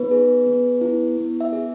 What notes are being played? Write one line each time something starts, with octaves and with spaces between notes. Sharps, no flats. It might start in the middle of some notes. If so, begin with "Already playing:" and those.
Already playing: B3 D#4 B4
G#4
B3
E4
B3
E5
G#4